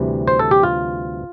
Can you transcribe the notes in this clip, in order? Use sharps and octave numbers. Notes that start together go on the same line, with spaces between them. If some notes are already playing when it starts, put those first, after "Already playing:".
Already playing: D2 C3 E3 G3
C5
A4
G4
F4